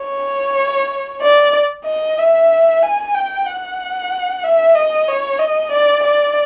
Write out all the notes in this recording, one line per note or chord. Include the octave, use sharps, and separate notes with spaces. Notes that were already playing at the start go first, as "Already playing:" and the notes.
Already playing: C#5
D5
D#5
E5
G#5
G5
F#5
E5
D#5
C#5
D#5
D5
D5